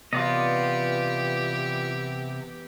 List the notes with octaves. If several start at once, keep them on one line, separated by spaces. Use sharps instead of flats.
C3 E3 B3 F4 G4 D5 D#5